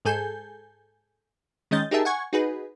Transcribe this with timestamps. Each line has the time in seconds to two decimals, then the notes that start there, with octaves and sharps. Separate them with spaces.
0.05 G#2 G#4 A4 G#5 G6
1.71 D#3 G#3 C#4 D#5 G6 A6
1.91 D#4 G4 G#4 A#4 E5 A5
2.05 F#5 G#5 C#6 G#6
2.33 D#4 F#4 G#4 B4